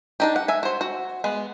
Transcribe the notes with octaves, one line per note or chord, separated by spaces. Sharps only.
D4 D#4 G4
F#5
E5 G#5
F#4 C5
F#4
G#3 B3